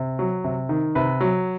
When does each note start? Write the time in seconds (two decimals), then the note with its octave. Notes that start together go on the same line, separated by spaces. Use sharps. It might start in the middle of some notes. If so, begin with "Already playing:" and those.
Already playing: C3
0.19 F#3
0.44 C3
0.69 D#3
0.95 C3 B4
1.20 F#3